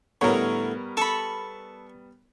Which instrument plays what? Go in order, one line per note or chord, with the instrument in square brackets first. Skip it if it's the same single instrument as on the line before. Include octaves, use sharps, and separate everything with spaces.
[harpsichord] A2 D3 [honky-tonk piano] G3 B3 [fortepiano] A#4 C#5
[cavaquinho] A4 B5 [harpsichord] A5 C#6